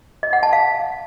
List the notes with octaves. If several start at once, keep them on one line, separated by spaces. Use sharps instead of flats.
D#5
F#5
A5
F5